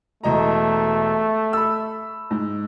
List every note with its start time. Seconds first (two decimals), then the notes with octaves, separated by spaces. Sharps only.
0.24 E1 A3 D#5 A#5
1.53 B5 E6
2.31 G#2